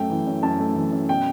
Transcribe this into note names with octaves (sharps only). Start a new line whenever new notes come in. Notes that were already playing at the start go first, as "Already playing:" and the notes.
Already playing: F#2 A3 G5
E3
F#2
F#2 A5
A3
E3
F#2
B2 G5